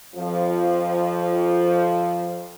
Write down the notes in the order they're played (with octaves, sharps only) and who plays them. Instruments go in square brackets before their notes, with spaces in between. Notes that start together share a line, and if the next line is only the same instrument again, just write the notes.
[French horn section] F2 F3